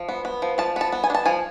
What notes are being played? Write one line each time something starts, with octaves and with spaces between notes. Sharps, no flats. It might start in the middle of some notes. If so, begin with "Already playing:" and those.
Already playing: F3
B3
B3
F3
F3 A5
B3 A5
B3
G#5
D4
A5
F3 G#5